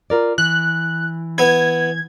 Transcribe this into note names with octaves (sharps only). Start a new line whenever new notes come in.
F4 A#4 D5
E3 F#6
B3 E4 G#6